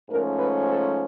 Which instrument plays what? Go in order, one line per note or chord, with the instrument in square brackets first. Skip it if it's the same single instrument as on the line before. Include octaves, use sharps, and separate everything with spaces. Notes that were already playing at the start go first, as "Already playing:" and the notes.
[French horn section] G#2 F3 A3 C#4 A#4
B4
A4